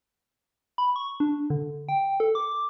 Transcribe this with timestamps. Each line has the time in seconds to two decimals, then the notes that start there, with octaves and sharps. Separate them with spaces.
0.78 B5
0.96 C#6
1.20 D4
1.50 D3
1.89 G5
2.20 A4
2.35 D6